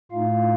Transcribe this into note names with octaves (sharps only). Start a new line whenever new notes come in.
A2 A3 D#4 F4 F5